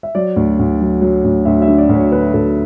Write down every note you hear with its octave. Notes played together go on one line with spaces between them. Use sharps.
E5
F#3 D5
D2
D2
F#3
F#3
D2
D2 E5
E5
D3
D5
D2
C#5
D3 B4
D2 A4